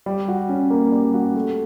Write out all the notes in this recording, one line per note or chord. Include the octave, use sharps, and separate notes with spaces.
G3
F#4
C#4
A#3
G3
F#4
A3